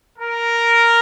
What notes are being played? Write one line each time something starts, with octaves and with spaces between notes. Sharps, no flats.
A#4